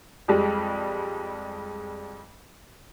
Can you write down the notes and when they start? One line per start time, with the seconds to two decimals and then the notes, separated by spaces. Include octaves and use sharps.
0.28 F2 G3 G#3